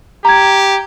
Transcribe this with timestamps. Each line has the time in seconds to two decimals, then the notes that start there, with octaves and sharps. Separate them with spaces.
0.25 G4 A#5 G#6